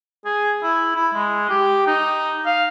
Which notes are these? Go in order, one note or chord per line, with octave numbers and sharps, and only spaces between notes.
G#4
E4
E4
G#3
G4
D#4
F5